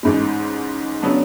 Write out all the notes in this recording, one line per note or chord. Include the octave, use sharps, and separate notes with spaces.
A1 G#2 G#3
C#3 F#3 B3 D4